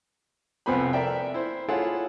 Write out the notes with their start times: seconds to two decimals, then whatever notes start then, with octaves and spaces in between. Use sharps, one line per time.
0.66 C2 F2 B3 C5 G#5 B5
0.93 A4 A#4 D5 E5 G5
1.34 E4 C5
1.68 E4 F4 G#4 A4 C#5 F#5